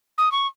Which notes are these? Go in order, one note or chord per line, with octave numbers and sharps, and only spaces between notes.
D#6
C#6